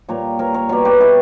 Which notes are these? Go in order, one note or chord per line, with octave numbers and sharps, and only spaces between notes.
A#2 G3 A#4 C#5
A#4 C#5
A#4 C#5
B2 G3 A#4 C#5
G4 B4
E4 G4